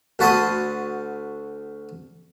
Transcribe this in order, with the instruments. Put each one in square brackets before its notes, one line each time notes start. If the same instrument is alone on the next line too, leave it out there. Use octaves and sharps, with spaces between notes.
[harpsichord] D2 F#4 A5 B5 C6 D#6